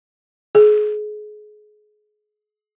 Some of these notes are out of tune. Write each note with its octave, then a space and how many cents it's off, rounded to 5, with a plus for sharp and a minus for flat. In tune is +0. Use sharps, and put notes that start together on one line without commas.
G#4 +30